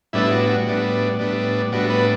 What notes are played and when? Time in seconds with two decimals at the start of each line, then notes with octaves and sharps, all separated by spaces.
0.13 A2 G3 B3 D4 E4
0.31 F#4
0.48 F#4
0.66 A2 G3 B3 D4
1.19 A2 G3 B3 D4
1.72 A2 G3 B3 D4 F#4
1.90 B3 B4